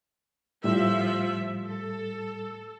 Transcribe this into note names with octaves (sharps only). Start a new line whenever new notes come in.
A2 F3 G3 E5
A4